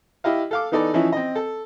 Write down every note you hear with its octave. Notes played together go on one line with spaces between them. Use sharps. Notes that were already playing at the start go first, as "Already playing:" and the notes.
E4 G4 D#5 F5
A4 F5 D6
E3 B3 D#4 A4 D5
E3 F3 C#4 D#4 E4
C4 D#5
A4